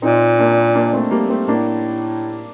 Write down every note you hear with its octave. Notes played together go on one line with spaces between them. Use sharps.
A#2 C4 D#4
A#3 D4
A#3 D4
A3 C4
G3 A#3
A3 C4
A2 A#3 D4